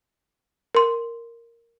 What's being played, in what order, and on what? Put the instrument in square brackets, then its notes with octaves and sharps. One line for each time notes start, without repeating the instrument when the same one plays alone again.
[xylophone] A#4 C6